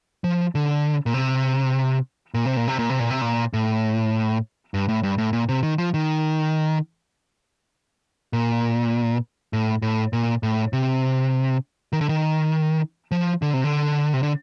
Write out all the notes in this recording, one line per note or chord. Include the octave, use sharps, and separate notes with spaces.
F3
D3
A#2
C3
A#2
C3
A#2
C3
A#2
C3
A#2
C3
A#2
A2
G2
A2
G2
A2
A#2
C3
D#3
F3
D#3
A#2
A2
A2
A#2
A2
C3
D#3
D3
D#3
F3
D3
C3
D3
C3
D3